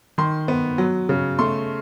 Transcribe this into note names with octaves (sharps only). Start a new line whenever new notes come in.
D#3 C6
B3
F#3
C#3
A3 C6